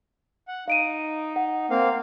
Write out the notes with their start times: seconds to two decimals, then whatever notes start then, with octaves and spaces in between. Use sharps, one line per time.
0.48 F#5
0.68 D#4 F5 D7 D#7
1.36 F#5
1.70 A#3 C4 F5